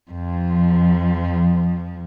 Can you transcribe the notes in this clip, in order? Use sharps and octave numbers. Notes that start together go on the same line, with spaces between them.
F2 F3